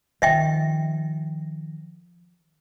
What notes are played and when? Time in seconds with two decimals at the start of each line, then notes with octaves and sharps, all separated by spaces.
0.22 D#3 F3 D#5 E5 G5